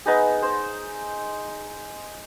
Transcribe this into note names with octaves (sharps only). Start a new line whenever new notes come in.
B3 D#4 G#4
C5